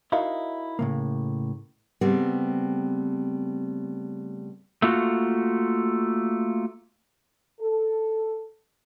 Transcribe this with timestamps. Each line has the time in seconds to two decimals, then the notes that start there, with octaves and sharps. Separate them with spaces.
0.12 D#4 E4 F#4 A#4 D#5 F5
0.79 A2 C#3 A#3
2.01 C#3 G3 A3 B3 C4
4.82 A3 A#3 F4 F#4
7.61 A4